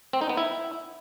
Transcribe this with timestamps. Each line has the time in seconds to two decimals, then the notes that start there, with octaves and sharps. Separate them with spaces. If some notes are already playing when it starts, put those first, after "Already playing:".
0.13 C4
0.21 D#4
0.29 B3
0.37 E4